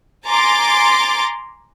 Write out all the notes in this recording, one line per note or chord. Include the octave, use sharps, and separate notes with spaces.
G#5 A#5 C6 D6 A6